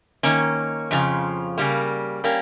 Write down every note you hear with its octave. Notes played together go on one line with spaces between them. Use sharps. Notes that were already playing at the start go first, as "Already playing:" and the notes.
D#3 A#3 C#4
F2 C#3 F3
C#3 G3 A#3
G3 A#3 C#4